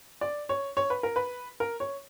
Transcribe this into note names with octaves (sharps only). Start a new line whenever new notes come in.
D5
C#5
C#5
B4
A#4
B4
A#4
C#5